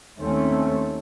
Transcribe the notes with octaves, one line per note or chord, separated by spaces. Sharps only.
D#2 A3 C4 C#4